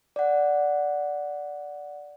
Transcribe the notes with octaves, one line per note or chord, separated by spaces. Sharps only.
D5 F#5